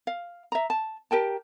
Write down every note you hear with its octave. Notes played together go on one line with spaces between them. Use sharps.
F5
E5 A#5
A5
G4 A#4 G5 A5